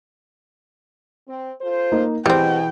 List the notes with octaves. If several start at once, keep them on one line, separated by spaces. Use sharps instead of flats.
C4
F4 A4 C5
A#3 D#4
B2 E3 G3 C4 G#4 G5